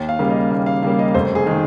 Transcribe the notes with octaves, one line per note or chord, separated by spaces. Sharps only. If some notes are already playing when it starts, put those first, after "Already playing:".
Already playing: D#2
F5
C#3 G3 A#3
D#5
D#2 F5
F5
C#3 G3 A#3 F5
D#5
F1 C5
G#4
D#3 G#3